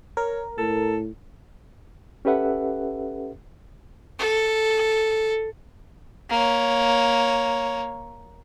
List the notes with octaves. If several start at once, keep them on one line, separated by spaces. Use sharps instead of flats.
A#4 C#5
A2 A4
C#4 G4 A4 B4 E5 F#5
A4
A#3 C#5